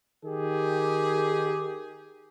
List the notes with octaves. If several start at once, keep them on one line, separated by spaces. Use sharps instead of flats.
D#3 G4 G#4